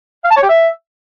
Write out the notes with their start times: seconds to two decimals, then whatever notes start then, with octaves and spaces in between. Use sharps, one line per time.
0.24 F5
0.31 A5
0.37 C#5
0.43 G4
0.49 E5